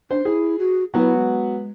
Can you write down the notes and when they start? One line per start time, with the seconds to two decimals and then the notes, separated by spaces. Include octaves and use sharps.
0.11 D4 C5
0.25 E4 G#4
0.59 F#4
0.94 F#3 B3 E4 F#4
1.17 G#3